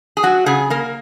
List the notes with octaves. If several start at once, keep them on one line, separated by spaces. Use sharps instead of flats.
G#4
F#3 F#4
C#3 G#4
A#3 A#4